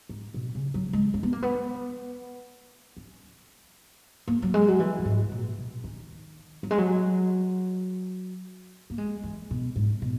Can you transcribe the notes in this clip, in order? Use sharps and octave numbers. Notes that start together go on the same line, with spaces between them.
G#2
B2
C#3
F#3
G#3
C#4
B3
A#3
B3
C#4
A#3
F#3
G#3
F#3
E3
F#2
G#2
A#2
B2
D#3
F#3
G#3
F#3
A#3
G#3
E3
B2
G#2
B2